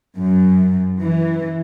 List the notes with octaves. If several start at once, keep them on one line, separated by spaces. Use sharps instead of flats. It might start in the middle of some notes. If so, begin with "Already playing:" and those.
F#2
E3